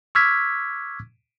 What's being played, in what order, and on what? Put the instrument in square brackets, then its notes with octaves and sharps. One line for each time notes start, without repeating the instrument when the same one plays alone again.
[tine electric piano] C#6 D6 E6 F6 G#6 B6